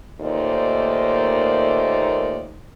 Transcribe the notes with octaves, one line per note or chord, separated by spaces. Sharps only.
D#2 A#2 A3 D#4 C5 D5